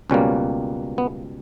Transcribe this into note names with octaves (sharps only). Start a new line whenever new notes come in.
C#2 B2 G3 A#3 C#4
B3